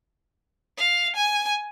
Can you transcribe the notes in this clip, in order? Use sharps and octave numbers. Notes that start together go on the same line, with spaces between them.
F5
G#5